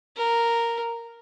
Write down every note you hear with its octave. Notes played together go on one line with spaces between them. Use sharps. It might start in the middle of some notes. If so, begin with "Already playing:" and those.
A#4